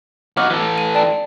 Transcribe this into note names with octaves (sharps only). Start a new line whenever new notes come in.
D#4 F#4 C#5 D6 F6
E3 A4
D#7
D5 G5 A5